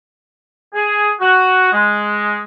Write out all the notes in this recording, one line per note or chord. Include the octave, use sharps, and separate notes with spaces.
G#4
F#4
G#3